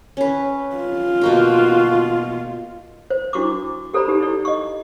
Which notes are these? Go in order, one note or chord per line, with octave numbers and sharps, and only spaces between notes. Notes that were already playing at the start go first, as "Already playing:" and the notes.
C#4 B4
F4
B2 A#3 F#4 G5
C5
D4 E4 F#4 C#6 D6
G4 A4 C5 D5 A#5 B5
D#4 G4 A4
E4 A4 D5
D#5 C#6